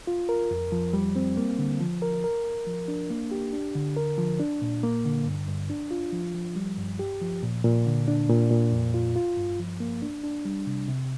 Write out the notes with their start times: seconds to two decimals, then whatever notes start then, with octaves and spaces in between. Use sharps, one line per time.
0.07 F4
0.29 A#4
0.51 F2
0.72 F3
0.93 G3
1.16 C4
1.37 A#3
1.59 D3
1.80 F3
2.02 A#4
2.24 A#4
2.45 A#4
2.67 F3
2.88 D4
3.10 A#3
3.31 G4
3.53 D4
3.75 D3
3.96 A#4
4.18 F3
4.40 D4
4.62 A#2
4.83 A#3
5.05 D3
5.26 G2
5.48 G2
5.70 D4
5.91 F4
6.13 F3
6.34 F3
6.56 G3
6.77 G2
6.99 G4
7.21 F3
7.43 A#2
7.64 A#2
7.86 D3
8.08 D4
8.29 A#2
8.51 A#2
8.72 F2
8.94 F4
9.16 F4
9.37 G2
9.59 F3
9.80 A#3
10.02 D4
10.24 D4
10.45 G3
10.67 C3
10.88 C3